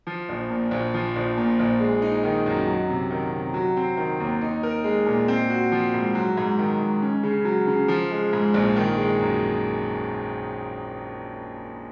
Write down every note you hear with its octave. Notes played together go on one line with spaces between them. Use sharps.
F3
A#1
A#2
A#1
F3
A#1
A#2
A#1
G#3
D#4
D#3
F#2
F#3
C3
D#3
C3
F#3
C4
D#3
D#2
D#4
A#4
G#3
A#2
C4
F#4
F3
G#2
F#3
G#2
D#3
G#2
C#4
C#3
F#3
C#3
F3
G#3
G#2
A#1
D#3
G#3
F#2